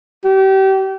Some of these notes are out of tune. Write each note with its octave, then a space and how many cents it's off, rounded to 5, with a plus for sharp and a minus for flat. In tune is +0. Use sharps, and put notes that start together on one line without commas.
G4 -30